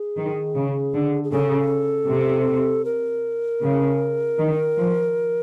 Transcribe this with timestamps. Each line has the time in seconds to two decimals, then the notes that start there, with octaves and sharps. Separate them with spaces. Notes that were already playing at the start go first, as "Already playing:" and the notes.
Already playing: G#4
0.17 D#3
0.55 C#3
0.93 D3
1.24 G#4
1.31 C#3 A4
2.08 C3
2.85 A#4
3.62 C#3
4.39 D#3
4.77 F3